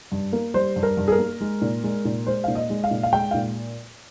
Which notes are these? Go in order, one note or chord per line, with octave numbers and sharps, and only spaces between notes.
G2
A#3
G3 C5
G2
A#4
G2
G#4
A#4
A#3
G#3
A#2
G#3
A#2
G#3 C5
A#2 F5
D#5
G#3
F5
A#2
F5
G#3 G5
A#2 F5